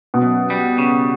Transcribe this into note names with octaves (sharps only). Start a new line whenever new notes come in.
B2
F#2
G3
C#3